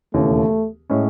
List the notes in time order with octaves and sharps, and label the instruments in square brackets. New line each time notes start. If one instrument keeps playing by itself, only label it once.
[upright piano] E1 D#2 C#3 E3 [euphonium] A3
[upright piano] A2 G#3 C#4